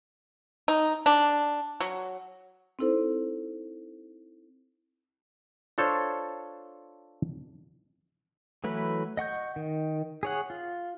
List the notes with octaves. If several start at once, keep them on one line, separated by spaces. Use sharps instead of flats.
D#4
D4
F#3
C4 D#4 E4 A4 C5
D4 F4 A4 C5 C#5
E3 F#3 A3 E4 B4
D#5 F#5 C#6 G6
D#3
G#4 C#5 F#5
F4